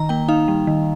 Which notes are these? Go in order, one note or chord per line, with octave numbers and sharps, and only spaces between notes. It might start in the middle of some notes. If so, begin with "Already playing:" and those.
Already playing: D#3 A#5
A#3 G5
D#4 F5
G3
D#3